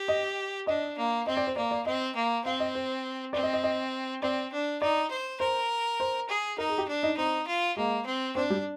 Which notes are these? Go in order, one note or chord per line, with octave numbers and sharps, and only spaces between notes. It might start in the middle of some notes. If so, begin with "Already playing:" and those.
Already playing: G4
D#5
D4 D#5
A#3
C4 D#5
D5
C5
A#3 D5
D5
C4 D#5
A#3
C4 F5
D#5
C5
C4 D5
D#5
D#5
D#5
C4 D5
D4
D#4 D5
C5
A#4 C5
C5
G#4
D#4 A#4
G#4
G4
D4
D#4
C4 D#4
F4
G#3 A#3
C4
C4 D4
G3